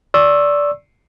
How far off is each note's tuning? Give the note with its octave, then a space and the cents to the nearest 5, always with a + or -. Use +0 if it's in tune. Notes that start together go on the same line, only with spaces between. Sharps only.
D5 -15 C#6 -40 E6 +0